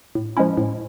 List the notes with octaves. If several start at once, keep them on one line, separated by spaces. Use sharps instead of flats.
A2
F3 G#3 C#4 E4
A2